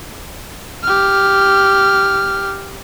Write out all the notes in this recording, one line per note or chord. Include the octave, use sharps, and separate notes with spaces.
G4 F6